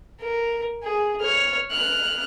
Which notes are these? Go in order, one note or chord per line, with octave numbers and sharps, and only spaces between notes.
A#4
G#4
C#5 F6
F6 F#6